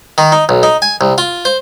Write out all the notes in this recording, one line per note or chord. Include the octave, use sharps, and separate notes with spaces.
D#3
D#4
B1
D#4
G#5
C2
F4
C5